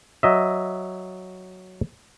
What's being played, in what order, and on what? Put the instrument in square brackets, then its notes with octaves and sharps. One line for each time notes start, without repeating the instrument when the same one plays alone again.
[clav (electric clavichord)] F#3 D#5 E5